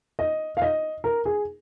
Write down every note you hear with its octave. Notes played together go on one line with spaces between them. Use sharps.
D#5
F5
D#5
A#4
G#4